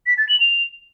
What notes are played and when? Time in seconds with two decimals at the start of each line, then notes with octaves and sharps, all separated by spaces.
0.07 B6
0.18 A6
0.29 F#7
0.40 F7